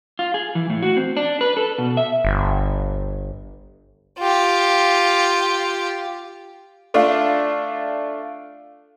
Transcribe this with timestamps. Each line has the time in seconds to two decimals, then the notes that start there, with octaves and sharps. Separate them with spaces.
0.19 F4
0.34 G#4
0.55 E3
0.70 A2
0.82 F#4
0.97 C4
1.17 D4
1.41 B4
1.57 A4
1.78 B2
1.97 E5
2.25 G1
4.19 F4 G4
6.94 A3 D4 F4